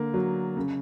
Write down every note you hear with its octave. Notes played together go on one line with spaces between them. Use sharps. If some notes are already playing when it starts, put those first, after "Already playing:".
Already playing: D3 A#3
F#3
C#3